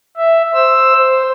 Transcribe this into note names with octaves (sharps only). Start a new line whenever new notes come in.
E5
C5 E6
C5